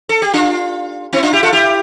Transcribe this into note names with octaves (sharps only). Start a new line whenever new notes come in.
A4
G4
D4 F4
C4 E4
D4 F4
E4 G4
F4 A4
E4 G4